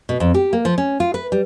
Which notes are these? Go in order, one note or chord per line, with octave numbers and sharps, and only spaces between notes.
B2
F2
G4
A#3
F3
C#4
F4
B4
G3